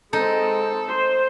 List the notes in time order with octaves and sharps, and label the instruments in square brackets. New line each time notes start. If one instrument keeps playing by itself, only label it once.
[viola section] G#3 C4 [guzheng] D#4 [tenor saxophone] A4
[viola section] C5